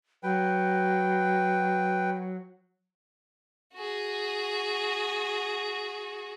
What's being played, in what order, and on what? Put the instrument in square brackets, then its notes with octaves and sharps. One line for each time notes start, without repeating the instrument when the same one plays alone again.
[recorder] F#3 [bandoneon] B4 G5
[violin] F#4 G#4